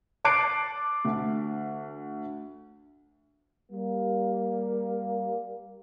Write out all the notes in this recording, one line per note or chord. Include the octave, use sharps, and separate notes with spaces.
A5 D6 F#6 C7 D7
D2
G3 A#3